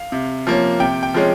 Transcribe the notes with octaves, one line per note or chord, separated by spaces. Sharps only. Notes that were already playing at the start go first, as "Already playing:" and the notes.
Already playing: F5
C3
F3 A#3 C#4
C3 G5
G5
F3 G#3 C#4